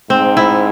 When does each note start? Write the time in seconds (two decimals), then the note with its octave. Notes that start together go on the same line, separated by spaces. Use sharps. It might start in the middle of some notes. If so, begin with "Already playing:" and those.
0.10 G#2 C4
0.37 E4